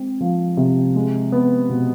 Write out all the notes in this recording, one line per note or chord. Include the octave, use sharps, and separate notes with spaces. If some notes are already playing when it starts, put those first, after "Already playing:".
Already playing: G#3 C4
F3
C3
G#3
B3
B2